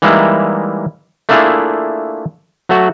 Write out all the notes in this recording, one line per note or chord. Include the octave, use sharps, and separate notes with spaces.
E3 G3 G#3 A#3 D#4 E4
A3 A#3 D4 E4 F4 G#4
F#3 A3 F#4